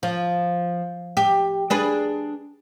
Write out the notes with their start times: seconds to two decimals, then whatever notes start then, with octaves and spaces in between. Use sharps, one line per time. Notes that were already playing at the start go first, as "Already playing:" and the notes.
0.03 F3
1.17 G4
1.70 D4 G#4 B4